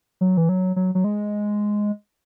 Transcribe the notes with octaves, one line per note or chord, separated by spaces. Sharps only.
F#3
E3
F#3
F#3
F#3
G#3